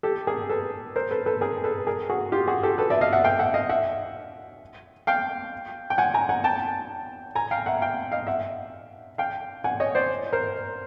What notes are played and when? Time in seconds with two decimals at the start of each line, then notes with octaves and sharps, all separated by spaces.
0.03 G4 A4
0.27 G#4 A#4
0.50 A4 B4
0.96 A#4 C5
1.11 A4 B4
1.26 A4 B4
1.41 G#4 A#4
1.64 A4 B4
1.87 G#4 A#4
2.10 F#4 G#4
2.32 F4 G4
2.47 F#4 G#4
2.63 G4 A4
2.78 A4 B4
2.90 D5 E5
3.01 D#5 F5
3.13 E5 F#5
3.24 F5 G5
3.39 E5 F#5
3.54 D#5 F5
3.69 E5 F#5
5.07 F5 G5
5.90 G5
5.98 F#5 G#5
6.14 G#5 A#5
6.29 F#5 G#5
6.44 G5 A5
7.35 G#5 A#5
7.51 F5 G5
7.66 E5 F#5
7.81 F5 G5
8.12 D#5 F5
8.27 E5 F#5
9.18 F5 G5
9.64 F#5 G#5
9.80 C#5 D#5
9.95 C5 D5
10.33 A#4 C5